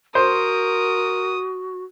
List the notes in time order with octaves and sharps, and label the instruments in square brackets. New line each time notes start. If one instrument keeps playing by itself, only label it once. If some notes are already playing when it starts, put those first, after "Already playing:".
[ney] F#4 [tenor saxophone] A#4 [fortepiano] C5 [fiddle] D#6